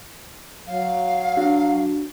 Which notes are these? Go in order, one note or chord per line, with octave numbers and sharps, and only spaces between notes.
F#3 F5
D4 F#4